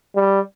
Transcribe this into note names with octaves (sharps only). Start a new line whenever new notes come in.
G3